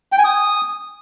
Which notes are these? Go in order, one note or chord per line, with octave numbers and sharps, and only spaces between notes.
G5
G#5
D#6